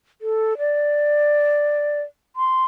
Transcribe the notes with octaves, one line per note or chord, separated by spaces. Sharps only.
A4
D5
C6